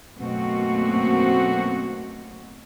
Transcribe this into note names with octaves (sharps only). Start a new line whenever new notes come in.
F#2 B2 A3 A#3 C4 F#4